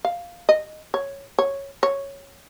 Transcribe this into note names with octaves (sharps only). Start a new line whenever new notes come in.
F5
D#5
C#5
C#5
C#5